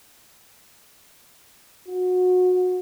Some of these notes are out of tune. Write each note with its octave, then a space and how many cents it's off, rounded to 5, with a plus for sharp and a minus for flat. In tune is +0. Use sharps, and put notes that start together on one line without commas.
F#4 -25